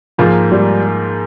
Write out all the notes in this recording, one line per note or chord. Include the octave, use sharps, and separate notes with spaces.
G#2 F3 G#3 A#3 F4
G3